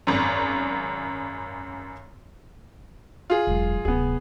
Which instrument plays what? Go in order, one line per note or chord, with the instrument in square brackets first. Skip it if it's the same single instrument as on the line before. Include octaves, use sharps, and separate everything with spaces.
[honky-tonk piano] G#1 F#2
[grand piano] F4 G#4
[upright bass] E1 F#2
[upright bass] D1 C3 [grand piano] B3 G#4